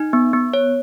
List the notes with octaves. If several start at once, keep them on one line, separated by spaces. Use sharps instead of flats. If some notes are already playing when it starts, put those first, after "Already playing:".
Already playing: D#4
B3
B3
C#5